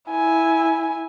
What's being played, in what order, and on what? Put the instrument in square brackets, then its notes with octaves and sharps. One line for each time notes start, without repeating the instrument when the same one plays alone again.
[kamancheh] E4 G#5